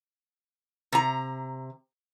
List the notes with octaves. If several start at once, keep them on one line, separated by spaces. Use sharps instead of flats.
C3 A#5